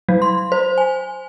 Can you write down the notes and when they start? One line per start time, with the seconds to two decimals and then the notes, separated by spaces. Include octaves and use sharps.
0.09 F#3
0.22 C6
0.52 C5
0.78 G#5